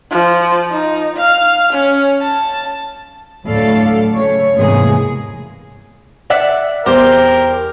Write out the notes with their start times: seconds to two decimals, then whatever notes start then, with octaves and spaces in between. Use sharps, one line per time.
0.11 F3
0.71 D#4
1.17 F5
1.73 C#4
2.22 A5
3.45 D2 A2 F#3 A4 D5 F5
4.12 C#3 A3 C#5
4.55 E2 G#2 C3 G#3 A#3 G#4
6.30 D5 E5 F#5
6.86 E2 G4 A#4 C5